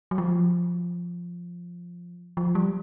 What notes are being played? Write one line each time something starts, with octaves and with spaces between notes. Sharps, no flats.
F#3
F3
F3
G3